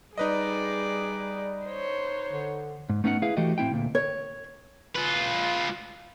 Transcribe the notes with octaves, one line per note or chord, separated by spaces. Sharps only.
G3 D#4 G#4 B4 D5 D#5
C5 C#5
D3
G#2
A3 B3 C#4 D#4 C#5 F#5
E4 G#4 B4 F5
E3 A3 F#4 G4 A4 D#5
A2 C4 E4 G5
D2 A#2
C#5
F4 B4